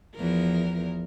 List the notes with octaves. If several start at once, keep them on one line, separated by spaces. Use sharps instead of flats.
E2 F3 A#4